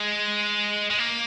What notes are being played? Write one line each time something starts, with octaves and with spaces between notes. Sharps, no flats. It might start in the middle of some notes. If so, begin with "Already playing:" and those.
Already playing: G#3
G#3
A#3